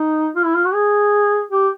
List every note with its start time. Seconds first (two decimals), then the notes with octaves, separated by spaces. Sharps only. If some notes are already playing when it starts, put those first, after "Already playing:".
Already playing: D#4
0.36 F4
0.45 E4
0.55 F4
0.65 F#4
0.74 G#4
1.51 G4